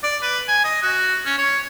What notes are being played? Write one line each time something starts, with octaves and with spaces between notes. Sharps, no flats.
D5
B4
G#5
D#5
F#4
C#4
C#5